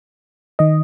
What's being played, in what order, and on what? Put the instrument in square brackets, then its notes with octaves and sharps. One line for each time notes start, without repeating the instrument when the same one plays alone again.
[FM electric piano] D#3 D#5